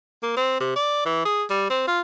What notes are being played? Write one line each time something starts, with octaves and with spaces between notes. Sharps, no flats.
A#3
C4
C3
D5
E3
G#4
G3
C4
F4